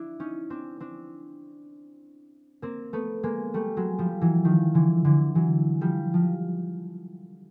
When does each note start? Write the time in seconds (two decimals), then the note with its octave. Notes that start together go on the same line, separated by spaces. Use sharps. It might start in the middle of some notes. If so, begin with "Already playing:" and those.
Already playing: D4 E4
0.20 C#4 D#4
0.50 C4 D4
0.80 C4 D4
2.62 A#3 C4
2.93 A3 B3
3.23 G#3 A#3
3.54 G3 A3
3.77 F#3 G#3
3.98 F3 G3
4.21 E3 F#3
4.45 D#3 F3
4.74 D3 E3
5.05 D3 E3
5.35 E3 F#3
5.81 F3 G3
6.14 F3